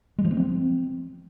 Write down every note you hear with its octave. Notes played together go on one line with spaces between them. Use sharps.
G#3
F3
B3
C4